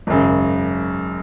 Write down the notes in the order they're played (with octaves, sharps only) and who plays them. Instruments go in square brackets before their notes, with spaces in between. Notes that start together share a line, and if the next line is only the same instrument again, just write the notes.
[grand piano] G#1 F#2 C#3